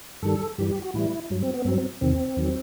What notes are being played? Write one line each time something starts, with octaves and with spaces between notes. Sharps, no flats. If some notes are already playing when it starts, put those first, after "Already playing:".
G2 D#3 G3 A4
G2 E3 G3 G4
G4
F#4
A2 E3 G3 E4
G2 F#3
C4
B3
G2 F#3 C4
C4
E2 C3 D#3 C4
E2 D#3 F#3